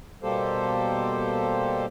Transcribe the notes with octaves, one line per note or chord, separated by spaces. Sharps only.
B2 G3 A#3 G4 A4 C5